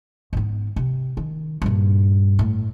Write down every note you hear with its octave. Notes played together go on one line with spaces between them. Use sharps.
G#2 B3
C3
D#3
G2 A#2
A2